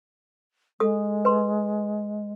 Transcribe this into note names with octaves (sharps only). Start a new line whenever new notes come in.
G#3 A4 D#6
B4 C6